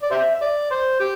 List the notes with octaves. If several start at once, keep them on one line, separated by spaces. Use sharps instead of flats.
D5
G4 C5 E5
E5
D5
C5
G4